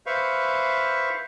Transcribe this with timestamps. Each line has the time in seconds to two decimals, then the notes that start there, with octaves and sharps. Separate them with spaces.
0.06 B4 C5 E5 F5 C#6